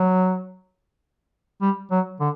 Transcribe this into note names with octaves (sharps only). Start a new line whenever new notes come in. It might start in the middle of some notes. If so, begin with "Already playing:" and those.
Already playing: F#3
G3
F#3
D3